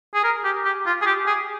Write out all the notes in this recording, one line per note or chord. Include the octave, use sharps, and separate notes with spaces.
G#4
A#4
G4
G4
F4
G#4
G4
G#4